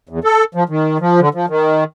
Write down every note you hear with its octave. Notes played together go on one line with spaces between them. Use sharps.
E2
A4
F3
D#3
F3
D3
F3
D#3